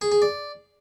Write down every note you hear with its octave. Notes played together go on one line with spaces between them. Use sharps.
G#4
G#4
D5